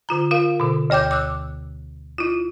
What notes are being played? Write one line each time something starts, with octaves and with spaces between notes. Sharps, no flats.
D3 F4 A#5
F4 A#4 F5
B2 D3
D2 C#5 G5 D6 G6
D6 E6 F#6
E4 F4